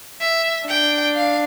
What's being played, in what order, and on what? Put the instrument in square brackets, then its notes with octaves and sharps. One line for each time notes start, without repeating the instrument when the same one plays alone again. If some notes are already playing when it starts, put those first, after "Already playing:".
[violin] E5
[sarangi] D4 [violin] G5
[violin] F5